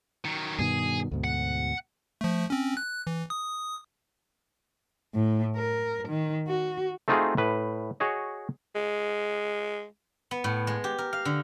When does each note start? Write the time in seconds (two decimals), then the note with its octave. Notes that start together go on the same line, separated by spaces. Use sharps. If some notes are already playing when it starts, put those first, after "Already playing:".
0.25 D#3 F#3
0.59 G2 B2 D#3 G#4
1.11 D2 G#2 B2
1.24 F#5
2.21 F3 A3
2.50 C4 C#4
2.77 F#6
3.07 E3
3.30 D#6
5.15 A2
5.56 A#4
6.08 D#3
6.48 F#4
7.08 A3 C4 D#4 F4 F#4 G#4
7.37 A2 B4
8.00 F#4 G#4 C#5 D#5
8.75 G#3
10.31 B3
10.44 A2
10.67 G#3
10.84 G4
10.98 A#4
11.13 F5
11.25 D3